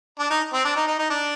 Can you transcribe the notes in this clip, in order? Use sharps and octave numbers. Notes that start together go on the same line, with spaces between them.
D4
D#4
C4
D4
D#4
D#4
D#4
D4